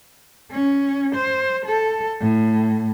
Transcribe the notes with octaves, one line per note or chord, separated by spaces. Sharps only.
C#4
C5
A4
A2